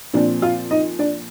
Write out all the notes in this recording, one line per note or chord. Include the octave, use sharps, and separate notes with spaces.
A#2 F3 C4 D4 D5
F4 F5
D#4 D#5
D4 D5